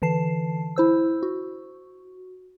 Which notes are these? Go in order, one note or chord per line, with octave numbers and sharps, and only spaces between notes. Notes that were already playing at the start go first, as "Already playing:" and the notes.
D3 E3 A5 C7
E4 C5 E6
F#4